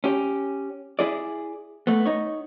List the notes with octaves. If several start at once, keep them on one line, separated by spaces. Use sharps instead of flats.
C#4 G4
E4 G#4 D5
A3 B3
D#4 C#5